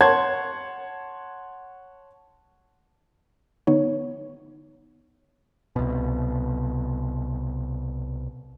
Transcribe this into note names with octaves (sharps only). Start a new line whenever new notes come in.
C#5 F#5 A5 C6 G#6
D3 B3 D#4 C#5
C2 B2